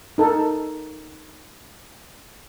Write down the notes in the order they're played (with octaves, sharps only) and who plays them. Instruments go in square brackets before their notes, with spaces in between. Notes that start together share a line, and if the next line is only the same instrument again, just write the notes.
[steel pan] D#4 A4 A#4